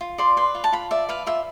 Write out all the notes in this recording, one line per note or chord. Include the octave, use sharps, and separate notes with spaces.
F4
D5 C6
B4 C6
F4
A5
F4 B5
D5 E5
B4 F5
F4 E5